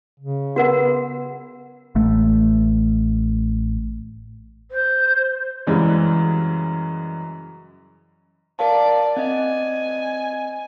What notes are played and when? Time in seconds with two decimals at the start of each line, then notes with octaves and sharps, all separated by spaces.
0.20 C#3
0.56 B3 F#4 A#4 F#5
1.95 A1 A3
4.71 C5
5.67 F#2 C#3 E3 G3 G#3
8.59 A#4 D5 F5 A5
9.17 C4 D#5 G#5 A6